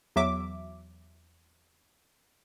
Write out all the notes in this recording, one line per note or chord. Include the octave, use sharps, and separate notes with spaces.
E2 F#3 E5 D6